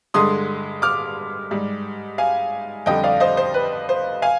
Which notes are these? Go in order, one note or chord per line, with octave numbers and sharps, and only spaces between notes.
G2 D3 G#3 C6 D#6
D6 F6
G#2 G3
F5 G#5
F2 D3 G3 D#5 G5
D5 F5
C5 D#5
C5
B4
C5
F5 G#5